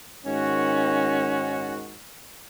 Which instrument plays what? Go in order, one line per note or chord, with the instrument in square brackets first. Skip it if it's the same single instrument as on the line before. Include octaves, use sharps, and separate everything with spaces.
[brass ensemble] G#2 D#3 F#4 [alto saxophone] C#4